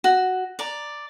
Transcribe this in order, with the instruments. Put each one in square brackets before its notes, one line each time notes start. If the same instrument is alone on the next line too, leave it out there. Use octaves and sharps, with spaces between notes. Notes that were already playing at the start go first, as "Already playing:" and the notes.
[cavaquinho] F#4
D5 A#5